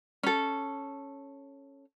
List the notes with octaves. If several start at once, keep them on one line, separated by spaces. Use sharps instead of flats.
C#4 A4